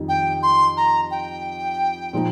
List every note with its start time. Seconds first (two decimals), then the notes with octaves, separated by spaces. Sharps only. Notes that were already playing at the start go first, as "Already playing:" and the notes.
Already playing: F2 D#3 G3 D#4
0.09 G5
0.43 C6
0.77 A#5
1.11 G5
2.13 A#2 F3 D#4